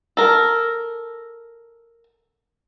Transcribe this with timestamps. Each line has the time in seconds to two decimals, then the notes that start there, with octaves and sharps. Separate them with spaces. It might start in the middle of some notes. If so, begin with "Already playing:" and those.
0.17 A4 A#4